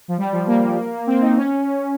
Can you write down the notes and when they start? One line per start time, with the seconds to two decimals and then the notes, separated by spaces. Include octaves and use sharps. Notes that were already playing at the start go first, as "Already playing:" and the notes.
0.08 F3
0.18 G3
0.32 F3
0.47 A#3
1.07 C4
1.21 D#4
1.37 C#4